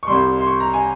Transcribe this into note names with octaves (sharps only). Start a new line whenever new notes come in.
C#6
C2 C3 G3 C6
C6
C#6
A#5
G#5